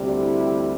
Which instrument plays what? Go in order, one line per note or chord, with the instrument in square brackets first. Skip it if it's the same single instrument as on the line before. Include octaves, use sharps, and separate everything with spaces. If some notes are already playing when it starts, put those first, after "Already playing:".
Already playing: [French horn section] D2 C3 G3
E4